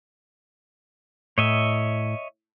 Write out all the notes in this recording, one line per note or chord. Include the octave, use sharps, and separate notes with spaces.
A2 C#5 D#5 E5